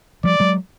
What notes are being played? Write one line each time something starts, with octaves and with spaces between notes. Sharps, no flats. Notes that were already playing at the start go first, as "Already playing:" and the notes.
F3 G3 D5
F#3 G#3